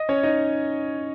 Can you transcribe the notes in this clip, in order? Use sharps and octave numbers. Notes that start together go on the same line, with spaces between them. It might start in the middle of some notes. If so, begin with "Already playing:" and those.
Already playing: D#5
C#4 C#5
D#4 D#5